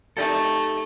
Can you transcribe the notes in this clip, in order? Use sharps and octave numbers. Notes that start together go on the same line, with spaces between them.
A3 D#4 G4 A4